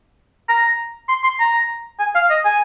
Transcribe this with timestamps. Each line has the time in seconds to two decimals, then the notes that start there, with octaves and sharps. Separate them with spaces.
0.49 A#5
1.09 C6
1.24 C6
1.40 A#5
2.00 G#5
2.15 F5
2.30 D#5
2.45 G#5